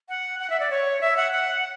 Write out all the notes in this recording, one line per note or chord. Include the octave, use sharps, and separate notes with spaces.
F#5
F#5
E5
D5
C#5
E5
F#5
F#5